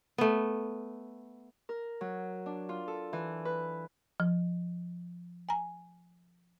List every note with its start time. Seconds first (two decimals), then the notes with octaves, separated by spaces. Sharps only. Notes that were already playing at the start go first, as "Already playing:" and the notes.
0.18 A3 B3
1.69 A#4
2.01 F#3
2.46 D4
2.69 F4
2.88 A4
3.13 E3
3.45 B4
4.20 F3
5.49 G#5 A#5